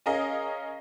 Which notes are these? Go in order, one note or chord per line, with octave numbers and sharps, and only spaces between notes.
C#4 G#4 A#4 D#5 F5